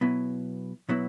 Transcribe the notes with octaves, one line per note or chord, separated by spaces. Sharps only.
B2 F#3 B3 E4
B2 F#3 B3 E4